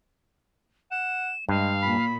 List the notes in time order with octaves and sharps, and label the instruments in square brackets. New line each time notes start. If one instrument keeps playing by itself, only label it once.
[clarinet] F#5 [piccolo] E7
[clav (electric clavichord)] G2 [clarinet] G#3 [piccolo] F5
[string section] A#2 [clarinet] B5